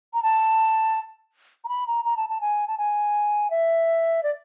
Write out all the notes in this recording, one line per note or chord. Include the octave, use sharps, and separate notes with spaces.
A#5
A5
A#5
B5
A#5
A#5
A5
A5
G#5
A5
G#5
E5
D5